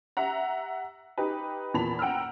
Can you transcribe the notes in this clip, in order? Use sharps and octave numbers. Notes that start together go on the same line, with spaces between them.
G4 E5 F#5 A#5
D#4 G4 B4
E2 A#2 A#3 A5 B5 F7
F#5 G5 A#5 E6 F6